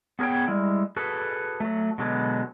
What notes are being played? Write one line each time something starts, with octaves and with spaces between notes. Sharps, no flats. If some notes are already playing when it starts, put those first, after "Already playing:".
B3 G#4 A#4 C#5 G5
G3 G#3 E4
F#4 G#4 A4 B4
F#3 A3
B2 D3 F#3 G#3 A#3 B3